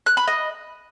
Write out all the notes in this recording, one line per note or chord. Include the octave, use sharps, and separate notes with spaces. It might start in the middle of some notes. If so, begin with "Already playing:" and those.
F#6
B5
D#5